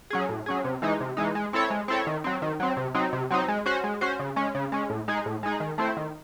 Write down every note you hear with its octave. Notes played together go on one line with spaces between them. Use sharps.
F#3 C#4 G#4
A2
F#3 C#4 G#4
C3
E3 G#3 D#4
C3
E3 G#3 D#4
G#3
C4 E4 A4 C#5
G#3
C4 E4 A4 C#5
D#3
F#3 C4
D#3
F#3 C4
C3
F#3 C4 D#4
C3
F#3 C4 D#4
G#3
C#4 F#4 C5
G#3
C#4 F#4 C5
C#3
G#3 C#4
C#3
G#3 C#4
A2
G#3 D#4 G#4
A2
G#3 D#4 G#4
D#3
A3 C4 E4 C5
D#3